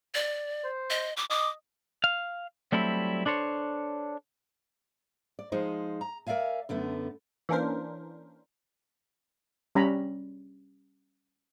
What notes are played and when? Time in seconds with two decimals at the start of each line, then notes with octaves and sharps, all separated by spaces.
0.14 D5
0.64 C5
0.90 D#5
1.17 D6
1.30 D#5 D6
2.04 F5
2.72 F#3 G3 A3 C4 E4
3.26 D4 A4 C5 C#5
5.39 D5
5.52 F3 G#3 D#4 C5
6.01 A#5
6.27 A#4 D5 E5 F5 G#5
6.69 F#2 D3 A3 B3
7.49 E3 A#3 C#4 D4 A#4 C5
9.75 G3 C#4 A#5 B5